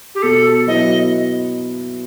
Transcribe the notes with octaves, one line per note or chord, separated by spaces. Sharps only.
G4
B2 A4
F#3 B3 E4 D#5